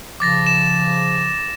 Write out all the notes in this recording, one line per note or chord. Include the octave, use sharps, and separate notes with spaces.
C#3 F3 D6 A6 A#6
E7